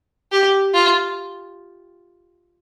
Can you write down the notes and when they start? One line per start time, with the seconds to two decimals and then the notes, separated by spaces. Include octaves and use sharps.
0.32 G4
0.74 F4